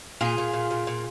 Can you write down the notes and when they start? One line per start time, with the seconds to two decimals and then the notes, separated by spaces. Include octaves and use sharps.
0.21 A#2 F4 G#4
0.38 A#2
0.53 A#2
0.71 A#2
0.87 A#2